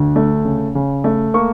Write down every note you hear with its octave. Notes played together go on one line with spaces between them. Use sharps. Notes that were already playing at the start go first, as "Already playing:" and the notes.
Already playing: D2 D3
A3
C#3
C#3
A3
A#3 C#6